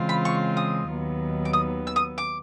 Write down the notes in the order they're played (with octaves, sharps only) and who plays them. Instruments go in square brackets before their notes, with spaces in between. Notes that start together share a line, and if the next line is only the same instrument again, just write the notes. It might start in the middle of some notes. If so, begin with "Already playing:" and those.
Already playing: [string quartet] C#3 E3 G#3 C4 F4
[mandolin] B5
C#6
D#6
[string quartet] D#2 D#3 F#3 B3
[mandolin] D6
D#6
E6
D#6
D6